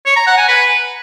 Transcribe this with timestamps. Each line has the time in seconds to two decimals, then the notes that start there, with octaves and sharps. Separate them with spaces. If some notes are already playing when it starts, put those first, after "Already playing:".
0.06 C#5
0.16 A#5
0.27 F#5
0.37 G#5
0.48 B4